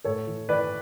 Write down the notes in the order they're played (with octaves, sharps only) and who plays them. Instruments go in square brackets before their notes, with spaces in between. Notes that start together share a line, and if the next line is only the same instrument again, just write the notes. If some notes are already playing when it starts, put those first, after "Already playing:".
[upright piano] A2 A4 C#5
E3
E3 B4 D5